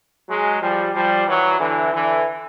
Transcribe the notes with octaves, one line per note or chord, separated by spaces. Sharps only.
F#3 G#3
F3 G3
F3 G3
E3 F#3
D3 E3
D3 E3